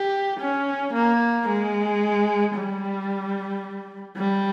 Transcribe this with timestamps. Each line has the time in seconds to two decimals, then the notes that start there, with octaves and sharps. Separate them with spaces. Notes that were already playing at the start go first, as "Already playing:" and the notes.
Already playing: G4
0.40 C#4
0.93 A#3
1.48 G#3
2.55 G3
4.17 G3